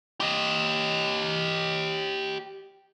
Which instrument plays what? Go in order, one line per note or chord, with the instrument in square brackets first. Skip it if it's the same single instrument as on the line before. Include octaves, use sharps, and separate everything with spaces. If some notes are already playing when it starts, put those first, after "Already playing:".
[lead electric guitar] G4 D#5